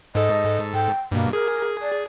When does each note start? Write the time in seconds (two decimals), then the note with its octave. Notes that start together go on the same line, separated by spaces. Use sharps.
0.15 G#2 A4 D#5
0.74 G5
1.12 G2 B2 A#3
1.33 G#4 A#4
1.82 D5